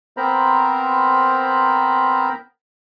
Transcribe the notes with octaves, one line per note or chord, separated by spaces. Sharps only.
B3 C4 A#4 C5 A#5 B5